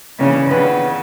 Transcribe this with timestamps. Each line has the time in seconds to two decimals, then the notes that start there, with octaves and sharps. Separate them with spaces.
0.19 C#3 E3 A#3 C#4 D4
0.51 C#3 B3 D4 B4